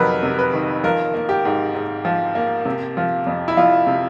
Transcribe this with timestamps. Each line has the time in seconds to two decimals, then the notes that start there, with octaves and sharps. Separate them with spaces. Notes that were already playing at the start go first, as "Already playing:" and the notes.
Already playing: F2 C3 D#3 F#3 A#4 B4
0.23 C3
0.39 B4
0.53 D#3
0.84 F3 A#4
1.14 A#3
1.29 G4
1.45 G#2
1.74 G#2
2.05 F3
2.35 A#3
2.65 C3
2.97 F3
3.26 F2
3.48 E4
3.57 F2 F4
3.87 C3